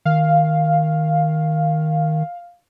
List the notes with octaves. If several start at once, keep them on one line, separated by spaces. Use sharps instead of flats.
D#3 F5